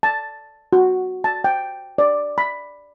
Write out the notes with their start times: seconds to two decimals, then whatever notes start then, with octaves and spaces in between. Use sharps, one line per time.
0.03 A5
0.73 F#4
1.24 A5
1.44 G5
1.98 D5
2.38 B5